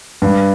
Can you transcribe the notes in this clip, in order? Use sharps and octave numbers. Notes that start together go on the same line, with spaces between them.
G2